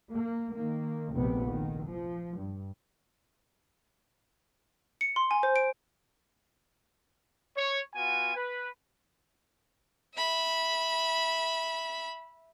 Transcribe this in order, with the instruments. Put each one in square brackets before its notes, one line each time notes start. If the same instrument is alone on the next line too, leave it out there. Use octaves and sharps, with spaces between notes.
[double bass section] A#3
D#3 A#3
F1 A#1 C3 B3
D#3
F3
G2
[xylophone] C#7
C6
G#5
C5
D7
[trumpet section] C#5
B3 F4 F#4 G#5
B4
[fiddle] E5 B5